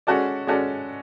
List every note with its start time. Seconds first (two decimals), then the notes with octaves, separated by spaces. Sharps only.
0.07 G#3 C#4 F#4 A4 D5
0.47 G#3 C#4 F#4 A4 D5